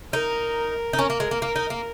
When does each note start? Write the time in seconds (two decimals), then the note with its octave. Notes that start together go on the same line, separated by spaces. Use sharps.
0.13 D#4 A#4
0.93 D#4
0.99 C#4 A#4
1.10 A#3
1.20 G#3
1.31 A#3
1.42 A#3
1.56 D#4
1.70 A#3